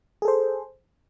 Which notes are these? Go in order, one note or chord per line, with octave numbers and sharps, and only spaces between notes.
G#4 A4 C5